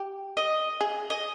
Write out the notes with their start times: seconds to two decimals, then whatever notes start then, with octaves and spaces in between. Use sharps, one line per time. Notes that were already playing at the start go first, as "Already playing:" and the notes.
Already playing: G4
0.37 D#5
0.81 G#4
1.10 D#5